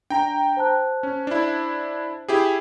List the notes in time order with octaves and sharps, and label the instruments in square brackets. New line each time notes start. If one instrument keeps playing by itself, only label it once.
[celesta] D4 [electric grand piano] G5 A#5
[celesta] C5 A5 F#6
[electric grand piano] C#4
D4 E4
E4 G4 G#4